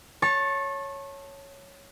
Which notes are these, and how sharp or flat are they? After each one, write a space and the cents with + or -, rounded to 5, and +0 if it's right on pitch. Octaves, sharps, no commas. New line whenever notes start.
C#5 +0 A5 +0 C#6 -30